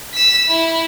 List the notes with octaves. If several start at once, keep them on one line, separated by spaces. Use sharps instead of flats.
E6 B6
E4